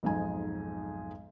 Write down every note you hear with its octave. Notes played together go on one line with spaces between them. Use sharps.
B1 F2 G#2 D#4 G#5